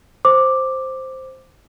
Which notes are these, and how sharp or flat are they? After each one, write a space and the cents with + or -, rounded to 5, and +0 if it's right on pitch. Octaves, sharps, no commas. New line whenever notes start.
C5 +0 D6 +5